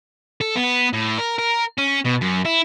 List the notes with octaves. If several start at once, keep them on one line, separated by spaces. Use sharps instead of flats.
A4
B3
A2
A#4
A#4
C#4
B2
F#2
E4